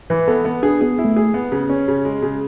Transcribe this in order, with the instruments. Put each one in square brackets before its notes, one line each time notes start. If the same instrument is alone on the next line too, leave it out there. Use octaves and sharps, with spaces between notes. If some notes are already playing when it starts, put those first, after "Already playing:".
[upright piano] E3 [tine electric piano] B4
[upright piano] B3 [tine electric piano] A4
[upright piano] B3
[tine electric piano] D4 [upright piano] G#4
[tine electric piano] B3 [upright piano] G#4
[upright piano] E4
[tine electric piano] A3
[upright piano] G#4
B3
C#3
C#4
C#3
G#3
C#3